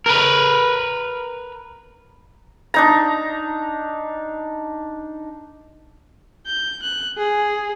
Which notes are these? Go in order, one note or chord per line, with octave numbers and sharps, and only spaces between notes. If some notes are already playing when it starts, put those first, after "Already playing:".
A#4 B4
D4 D#4 A#5
G6
F#6
G#4